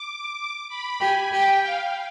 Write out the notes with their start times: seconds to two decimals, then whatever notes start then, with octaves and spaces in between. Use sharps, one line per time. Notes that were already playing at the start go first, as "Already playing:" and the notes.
Already playing: D6
0.38 D6
0.69 B5
1.00 G4 G#5
1.32 G4 G5
1.62 F5